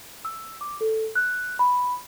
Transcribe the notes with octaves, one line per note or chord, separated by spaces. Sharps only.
E6
D6
A4
F#6
B5